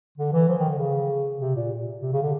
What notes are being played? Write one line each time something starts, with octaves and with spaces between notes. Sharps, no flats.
D3
E3
F3
D#3
D3
C#3
C3
A#2
C3
C#3
D3